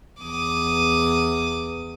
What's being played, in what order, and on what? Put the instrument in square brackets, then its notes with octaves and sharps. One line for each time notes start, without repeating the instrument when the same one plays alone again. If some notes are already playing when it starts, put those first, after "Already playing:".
[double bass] E2 [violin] D6 D#6